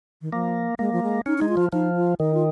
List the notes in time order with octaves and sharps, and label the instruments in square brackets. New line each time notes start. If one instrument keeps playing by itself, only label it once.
[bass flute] D#3
[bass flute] F3 [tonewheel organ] A#3
[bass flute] G#3 [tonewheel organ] A#3
[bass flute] F3
G#3
[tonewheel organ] C#4 [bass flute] D#4
[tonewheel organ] G#3 [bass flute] D#4
[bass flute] F4
[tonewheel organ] F3
[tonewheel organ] F3 [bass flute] D#4
[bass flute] F4
[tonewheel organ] D#3 [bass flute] D#4
[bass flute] F4